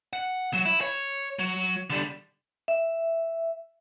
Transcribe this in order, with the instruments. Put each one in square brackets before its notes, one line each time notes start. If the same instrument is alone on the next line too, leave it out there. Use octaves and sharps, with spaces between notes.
[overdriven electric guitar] F#5
F#3
E4
C#5
F#3
D3 G3
[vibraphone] E5